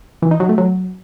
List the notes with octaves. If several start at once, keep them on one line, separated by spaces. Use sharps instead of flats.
E3
D#4
F#3
A3
F#3